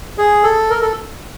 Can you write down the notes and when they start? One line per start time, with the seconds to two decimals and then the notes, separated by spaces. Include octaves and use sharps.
0.18 G#4
0.43 A4
0.70 A#4
0.82 A4